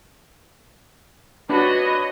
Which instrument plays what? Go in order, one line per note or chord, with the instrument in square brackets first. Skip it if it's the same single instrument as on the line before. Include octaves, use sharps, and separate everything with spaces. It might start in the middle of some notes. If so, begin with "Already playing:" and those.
[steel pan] D4 [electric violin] F#4 D#5 [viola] B4 C#5